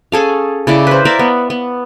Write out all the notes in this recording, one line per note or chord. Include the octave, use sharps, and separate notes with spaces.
C#4 G#4 A4 F5
C#3 E4 D5 D6
B4 C5
A#4 D5 E5 F5
B3
B3